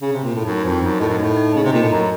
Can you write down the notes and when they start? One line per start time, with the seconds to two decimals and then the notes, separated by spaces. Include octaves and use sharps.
0.02 C#3
0.13 C3
0.23 A#2
0.34 A2
0.45 F#2 D#4
0.64 F2 C5
0.82 F#2 D#4
1.00 A2 D#5
1.09 F#2
1.18 A2 D#4
1.37 D#4
1.55 C#3 D#5
1.64 C3
1.73 A#2 D#5
1.82 A2
1.91 F#2 A#5